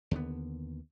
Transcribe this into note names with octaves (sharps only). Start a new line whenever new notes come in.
D#2 D3 B3